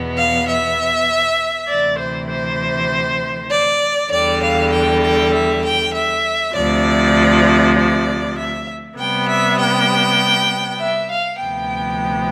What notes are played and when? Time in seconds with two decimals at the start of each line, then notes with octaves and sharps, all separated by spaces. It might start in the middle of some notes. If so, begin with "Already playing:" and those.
Already playing: E2 B2 B3
0.17 F5
0.48 E5
1.69 D2 C3 E3 D5
1.99 C5
2.30 C5
3.51 D5
4.11 E2 D3 G3 D5
4.42 F5
4.72 G5
5.03 G5
5.33 E5
5.63 G5
5.94 E5
6.54 D2 C3 F3 D5
7.76 D5
8.37 E5
8.97 C3 G3 B3 G5
9.28 E5
9.59 G5
10.79 E5
11.10 F5
11.40 D2 C3 F3 B3 G5